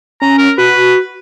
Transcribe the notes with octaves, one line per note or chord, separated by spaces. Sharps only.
C#4 A#5
A#4
F#4 B4